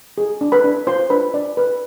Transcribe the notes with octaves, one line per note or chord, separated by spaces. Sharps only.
G#4
D4
B4 B5
D4
F4 C5 C6
D4 B4 B5
D4 D5
B4